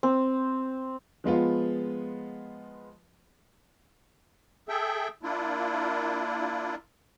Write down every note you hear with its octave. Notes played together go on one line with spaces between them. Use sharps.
C4
F3 G#3 B3 F4
G#4 A4 E5 G5
A#3 D4 E4 F4